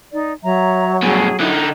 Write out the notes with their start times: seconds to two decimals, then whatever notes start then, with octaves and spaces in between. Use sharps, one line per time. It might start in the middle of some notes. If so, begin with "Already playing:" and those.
0.12 D#4 D5
0.43 F#3 C#5 E5 A#5
1.03 G2 B2 G#4 G#5
1.40 D3 D#4 E4